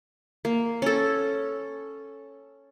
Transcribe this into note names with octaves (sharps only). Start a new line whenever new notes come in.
A#3
C#4 A4